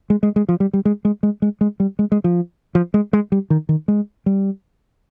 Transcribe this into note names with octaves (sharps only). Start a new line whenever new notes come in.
G#3
G#3
G#3
F3
G3
G3
G#3
G#3
G#3
G#3
G#3
G3
G#3
G#3
F3
F3
G#3
G#3
G3
D#3
D#3
G#3
G3